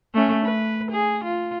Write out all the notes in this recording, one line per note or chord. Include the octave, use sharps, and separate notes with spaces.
A3 C#4
B4
G#4
F4